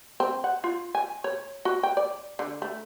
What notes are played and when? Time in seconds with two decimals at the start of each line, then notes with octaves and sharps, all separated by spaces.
0.20 C4
0.44 F#5
0.64 F4
0.95 G#5
1.24 C#5
1.65 F#4
1.83 G5
1.97 D5
2.39 D3
2.62 A3